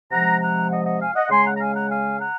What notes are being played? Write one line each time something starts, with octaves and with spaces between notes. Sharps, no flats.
C3 F3 G#3 F#5 A#5
F#5 A#5
D#5 F#5
D#5 F#5
F5 G#5
D#5 F#5
C#3 G#3 G#5 C6
F#5 A#5
A#5
F5 G#5
F#5 A#5
F5 G#5
F#5 A#5